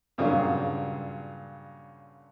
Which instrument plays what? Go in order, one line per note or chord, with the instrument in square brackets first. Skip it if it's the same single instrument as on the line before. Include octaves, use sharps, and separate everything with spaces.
[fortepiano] G2 A#2 C#3 F#3